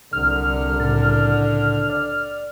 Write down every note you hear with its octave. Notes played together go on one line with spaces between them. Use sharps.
C2 D3 F6
A2 C#3 A6
D5